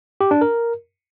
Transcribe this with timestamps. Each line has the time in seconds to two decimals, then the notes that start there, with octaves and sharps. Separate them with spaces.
0.21 G4
0.31 D4
0.41 A#4